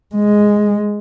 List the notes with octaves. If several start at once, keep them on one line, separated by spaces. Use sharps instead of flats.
G#3